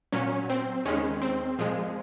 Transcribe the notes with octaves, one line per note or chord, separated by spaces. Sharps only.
A#2 F#3 C#4
C4
D#2 D#3 G#3 C#4
C4
A#2 F3 G#3